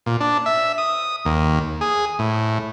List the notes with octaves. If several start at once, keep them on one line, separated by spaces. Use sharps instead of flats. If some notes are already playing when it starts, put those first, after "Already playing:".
A#2
D4
E5
D#6
D#2
G#4
A2